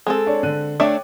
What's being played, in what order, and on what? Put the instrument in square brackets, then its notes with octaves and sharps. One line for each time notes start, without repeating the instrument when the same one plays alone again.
[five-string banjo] G#3 C4 A4
[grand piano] D4 C#5
D3 F#6 D#7
[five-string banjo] A3 D4 E5 [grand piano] C#5 G5 D6